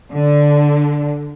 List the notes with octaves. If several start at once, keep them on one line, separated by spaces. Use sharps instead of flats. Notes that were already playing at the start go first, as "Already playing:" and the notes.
D3